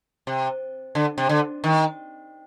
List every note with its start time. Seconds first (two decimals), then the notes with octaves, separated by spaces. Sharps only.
0.27 C3
0.95 D3
1.18 C3
1.29 D3
1.64 D#3